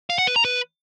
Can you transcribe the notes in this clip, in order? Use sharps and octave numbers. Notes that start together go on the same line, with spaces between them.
F5
F#5
B4
A#5
B4